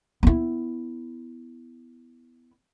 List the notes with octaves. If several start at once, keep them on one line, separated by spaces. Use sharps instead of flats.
B3 E4